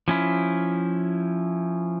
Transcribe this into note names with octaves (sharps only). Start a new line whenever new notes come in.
F3 C#4 E4